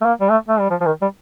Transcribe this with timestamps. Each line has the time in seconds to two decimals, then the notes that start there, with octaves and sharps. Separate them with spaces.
0.01 A3
0.05 A#3
0.21 G3
0.30 A3
0.48 A3
0.60 G3
0.70 F3
0.81 F3
0.86 D#3
1.02 G3